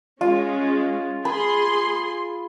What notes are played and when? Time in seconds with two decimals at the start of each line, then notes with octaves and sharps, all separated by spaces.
0.21 G#3 C#4 F4
1.25 G#4 B5 C6